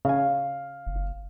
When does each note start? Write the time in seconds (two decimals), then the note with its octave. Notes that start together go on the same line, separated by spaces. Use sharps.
0.05 C#3 F5 G#5
0.87 F#1